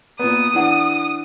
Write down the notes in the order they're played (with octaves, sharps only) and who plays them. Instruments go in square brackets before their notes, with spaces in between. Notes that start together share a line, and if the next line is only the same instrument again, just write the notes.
[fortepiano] A#2 B3 [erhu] D#6
[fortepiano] E3 D4 F#5